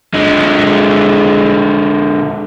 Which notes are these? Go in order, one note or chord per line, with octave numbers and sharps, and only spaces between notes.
D3 G#3